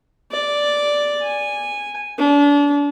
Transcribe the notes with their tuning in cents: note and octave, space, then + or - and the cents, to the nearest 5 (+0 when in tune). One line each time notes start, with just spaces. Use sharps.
D5 -5
G#5 -10
D4 -35